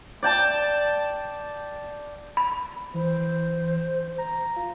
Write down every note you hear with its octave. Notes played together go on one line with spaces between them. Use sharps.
D5 G5 A5
B5
E3 C5
A#5
F4